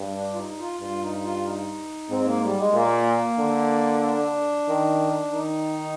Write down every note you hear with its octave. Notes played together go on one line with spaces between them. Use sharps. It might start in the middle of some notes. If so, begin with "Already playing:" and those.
Already playing: G2
D4
F4
D#4
F4
G2 F4
D#4
F4
D#4
G#2 C4
G#3
A#3
G3
G#3
A#2 A#3
D3
D4
D#3
D#3 D#4